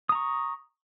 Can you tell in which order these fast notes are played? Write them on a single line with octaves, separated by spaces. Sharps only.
D#6 A#5 C#6